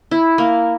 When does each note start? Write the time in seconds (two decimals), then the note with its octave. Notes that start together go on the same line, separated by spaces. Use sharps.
0.11 E4
0.38 A#3